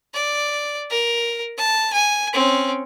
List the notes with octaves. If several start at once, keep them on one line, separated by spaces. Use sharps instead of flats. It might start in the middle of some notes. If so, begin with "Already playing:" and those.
D5
A#4
A5
G#5
C4 C#4